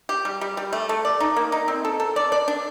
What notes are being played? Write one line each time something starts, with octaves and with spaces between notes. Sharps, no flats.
G4
G3
G3
G3
A3
A3
D5
D#4
A#3
D#4
C4
A4
A4
D5
D5
D4